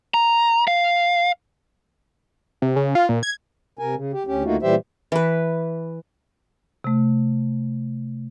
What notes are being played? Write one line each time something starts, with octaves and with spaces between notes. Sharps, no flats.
A#5
F5
C3
C#3
F4
A#2
G#6
C3 A#4 G#5
C#3
G4
D2 C#4 G4
D2 A3 A#3 D#4 F4 F#4
A#2 E3 G3 G4 C5 E5
E3 B4
C3 A3